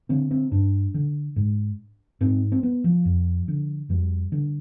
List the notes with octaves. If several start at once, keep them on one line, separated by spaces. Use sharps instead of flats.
D3 C4
C4
G2 D4
D3
G#2
G#2 C4
C4
B3
F3
F2
D3
F2 G3
D3